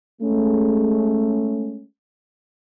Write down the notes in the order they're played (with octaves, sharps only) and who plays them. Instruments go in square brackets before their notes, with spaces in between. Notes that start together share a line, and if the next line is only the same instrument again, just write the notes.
[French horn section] G#3 A3 C#4